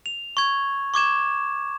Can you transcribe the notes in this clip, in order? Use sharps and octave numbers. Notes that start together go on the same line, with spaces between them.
F7
C#6 G#6
C#6 D6 G#6 E7